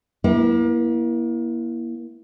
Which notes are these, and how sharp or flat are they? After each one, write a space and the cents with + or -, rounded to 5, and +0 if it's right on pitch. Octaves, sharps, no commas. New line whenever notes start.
A#3 +35 E4 +0